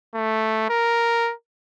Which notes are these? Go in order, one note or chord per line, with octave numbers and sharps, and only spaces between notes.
A3
A#4